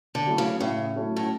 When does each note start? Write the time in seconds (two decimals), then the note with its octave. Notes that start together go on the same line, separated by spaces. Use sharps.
0.15 D3
0.26 F#3 A3 C#4 E4
0.38 C#3
0.60 A2 C#3
0.95 F#3 A3 C#4 E4
1.17 A2